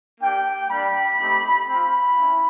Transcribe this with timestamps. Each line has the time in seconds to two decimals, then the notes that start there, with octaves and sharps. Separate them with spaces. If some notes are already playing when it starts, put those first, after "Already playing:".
0.21 A#3 D4 G4 G5
0.70 G3 A#3 D4 B5
1.19 A3 C4 D#4 G4
1.68 C4 F4 B5
2.18 C#4 E4